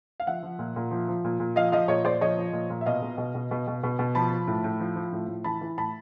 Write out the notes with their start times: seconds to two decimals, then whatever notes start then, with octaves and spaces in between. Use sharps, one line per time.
0.20 F5
0.27 F3 E5 F#5
0.43 F3
0.59 A#2
0.76 A#2
0.91 F3
1.08 F3
1.24 A#2
1.40 A#2
1.56 F3 D#5 F5
1.72 F3 D#5 F5
1.88 A#2 C#5 D#5
2.04 A#2 C5 D5
2.21 F3 C#5 D#5
2.37 F3
2.53 A#2
2.70 A#2
2.81 E5
2.86 B2 D#5 F5
3.02 B2
3.18 B2
3.35 B2
3.51 B2
3.67 B2
3.83 B2
3.99 B2
4.15 F3 A5 B5
4.31 F3
4.47 A2
4.64 A2
4.80 F3
4.96 F3
5.12 A2
5.28 A2
5.44 E3 A5 B5
5.61 E3
5.77 A2 A5 B5